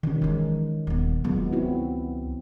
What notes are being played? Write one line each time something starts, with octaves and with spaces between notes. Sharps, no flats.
C3 D#3 C#4
E3 G#3
D#1 B3
C#2 F#3 B3
C4 E4 F#4